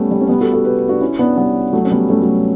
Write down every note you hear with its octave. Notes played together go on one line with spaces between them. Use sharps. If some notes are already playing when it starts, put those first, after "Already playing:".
Already playing: G3 A3 B3 C#4
G3
C#4
G3 B3
F#4 A4
F#4 A4
G4 B4
D4 F#4
C#4 E4
B3 D4
G3 B3
F#3 A3
C#4
G3 B3
A3 C#4
F#3 A3